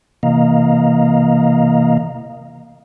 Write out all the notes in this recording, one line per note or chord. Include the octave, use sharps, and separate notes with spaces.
C3 E3 A#3 D#5 F5 A#5